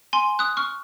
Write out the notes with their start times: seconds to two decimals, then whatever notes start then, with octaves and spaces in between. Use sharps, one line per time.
0.13 G#5 C6
0.39 D#6 F#6
0.57 C#6 F6